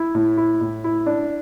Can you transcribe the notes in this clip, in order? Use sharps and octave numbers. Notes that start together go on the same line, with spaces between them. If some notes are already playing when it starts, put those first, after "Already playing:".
Already playing: E4
A2
E4
A2
E4
D4